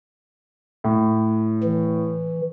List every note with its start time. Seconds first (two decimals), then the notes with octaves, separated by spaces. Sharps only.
0.84 A2
1.63 E3